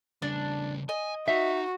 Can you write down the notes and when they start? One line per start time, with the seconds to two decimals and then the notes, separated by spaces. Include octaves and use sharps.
0.22 C#3 G3 D4
0.89 D#5 G#5
1.28 D#4 F#4 E5